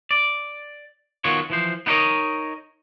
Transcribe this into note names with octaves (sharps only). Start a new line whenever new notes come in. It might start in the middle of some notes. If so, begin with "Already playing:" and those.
D5
D#3 B3 F4 F#4 C#5
E3 F3 C5
B3 D#4 E4 A#4 C#5 D#5